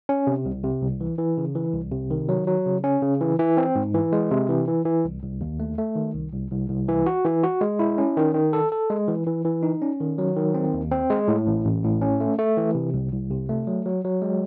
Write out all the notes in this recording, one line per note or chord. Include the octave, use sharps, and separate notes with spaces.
C#4
C3
C2
C3
C2
E3
E3
C#3
E3
C2
C3
D#3
F#3
F#3
C#3
C#4
C#3
E3
E3
C4
G#2
E3
G#3
C3
E3
E3
E3
C2
C2
D#2
A3
A3
D#3
C2
C2
C2
C2
E3
F#4
E3
F#4
G#3
E4
C#4
D#3
D#3
A4
A4
G#3
E3
E3
E3
D#4
C#4
D#3
F#3
D#3
C4
D#2
C4
G#3
A2
A1
A1
A2
C#4
A3
A3
E3
C3
C2
C2
C3
A3
F#3
F#3
F#3
G#3